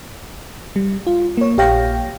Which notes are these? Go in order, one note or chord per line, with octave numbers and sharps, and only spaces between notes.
G3
F4
A#3 C#5
A#1 G4 C#5 F5 G5 A#6